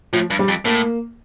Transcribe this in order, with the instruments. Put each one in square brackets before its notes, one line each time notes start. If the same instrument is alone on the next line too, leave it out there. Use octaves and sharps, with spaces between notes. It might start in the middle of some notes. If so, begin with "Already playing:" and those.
[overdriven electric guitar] A2 [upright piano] F3
[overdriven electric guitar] G2
[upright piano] G3
[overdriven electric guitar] F2
[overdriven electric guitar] A2 [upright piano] A#3